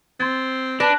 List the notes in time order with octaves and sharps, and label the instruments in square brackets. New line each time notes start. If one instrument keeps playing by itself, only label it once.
[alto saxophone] C4 [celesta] C6 G#6 A6
[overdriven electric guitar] D4 [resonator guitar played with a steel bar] B4 [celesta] A5 A#6